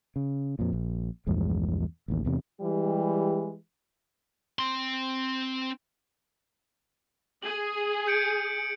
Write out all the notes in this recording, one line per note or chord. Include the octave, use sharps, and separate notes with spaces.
C#3
F2 A#2
A#1
A#1 E2 G2 G#3
A1 D#2
E2 C3
E3 G3 G#3 G4
C4 C6
G#4 F#7
G6 C#7 D7